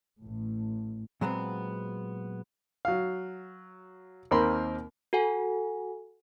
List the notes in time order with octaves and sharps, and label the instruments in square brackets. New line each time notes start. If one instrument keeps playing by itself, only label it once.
[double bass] A1 A2
[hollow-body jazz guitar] A#2 F#3 G#3 B3 C4
[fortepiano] F#3 F5
D#2 A#3 C4 A#4 B5 C6
[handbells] F#4 A4 F#5 G#5